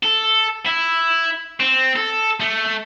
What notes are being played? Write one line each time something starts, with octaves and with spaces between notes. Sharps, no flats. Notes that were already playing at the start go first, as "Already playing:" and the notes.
A4
E4
C4
A4
A3